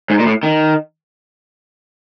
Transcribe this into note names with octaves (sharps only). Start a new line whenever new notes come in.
G#2
A#2
A2
D#3